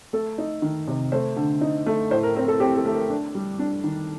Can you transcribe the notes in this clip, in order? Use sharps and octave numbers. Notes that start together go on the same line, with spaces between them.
A3 A4
D#4
D#3
C3
A3 C5
D3
D#4
A3
A2 C5
A#4
C4 A#4
A4
C4 G4
A4
A3
A#4
D4
G3
D4
D#3